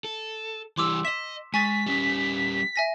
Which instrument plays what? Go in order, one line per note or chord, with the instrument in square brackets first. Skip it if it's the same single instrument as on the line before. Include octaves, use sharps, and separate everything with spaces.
[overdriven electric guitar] A4
[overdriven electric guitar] E3 G3 [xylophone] C6 D6 E6
[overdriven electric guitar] D#5 E5 [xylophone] B6 E7
[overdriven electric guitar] G#3 [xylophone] G#5 C#6 A6 [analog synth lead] B6
[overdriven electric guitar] G3 C#4
[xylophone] E5 G#5 A#6